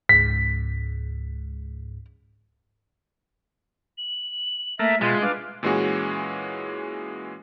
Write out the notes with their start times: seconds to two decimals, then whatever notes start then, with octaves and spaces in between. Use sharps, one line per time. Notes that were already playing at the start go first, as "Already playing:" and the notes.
0.09 C#2 G#2 B6
3.98 F#7
4.79 A3 A#3 E5
5.01 B2 G#3 F4 A6
5.22 D4 B4 F5
5.63 A#2 E3 G#3 C#4 F#4 G#4